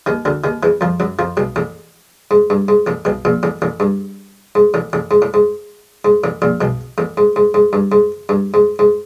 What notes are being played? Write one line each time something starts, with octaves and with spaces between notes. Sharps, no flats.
D#2 D#3
D2 D3
D#2 D#3
E2 E3
F2 F3
F#2 F#3
F2 F3
B1 B2
A1 A2
G#2
G2
G#2
A1 A2
B1 B2
A#1 A#2
A1 A2
A1 A2
G2
G#2
A1 A2
A1 A2
G#2
A2
G#2
G#2
A1 A2
A#1 A#2
B1 B2
A1 A2
G#2
G#2
G#2
G2
G#2
G2
G#2
G#2